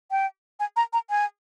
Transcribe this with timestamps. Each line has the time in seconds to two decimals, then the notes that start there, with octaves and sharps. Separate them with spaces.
0.11 G5
0.60 G#5
0.76 A#5
0.93 A#5
1.10 G#5